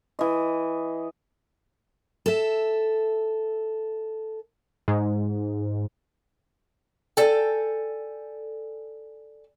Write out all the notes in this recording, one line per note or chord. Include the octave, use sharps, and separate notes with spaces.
E3 D#5
A4 E5
G#2
A4 D5 G5 G#5